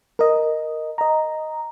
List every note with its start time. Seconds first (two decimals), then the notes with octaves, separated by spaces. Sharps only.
0.19 A#4 D#5
0.98 D#5 A#5